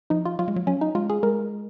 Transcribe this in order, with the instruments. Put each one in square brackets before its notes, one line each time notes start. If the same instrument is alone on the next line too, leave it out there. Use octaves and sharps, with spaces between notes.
[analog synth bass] F3 [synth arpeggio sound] D#4
[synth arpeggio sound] F4
[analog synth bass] F#3 [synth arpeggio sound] F4
[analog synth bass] G#3
F#3
[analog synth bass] F#3 [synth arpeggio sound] C#4
[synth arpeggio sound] D#4
[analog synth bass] G#3 [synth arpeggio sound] F4
[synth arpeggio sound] G#4
[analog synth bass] G#3 [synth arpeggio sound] A#4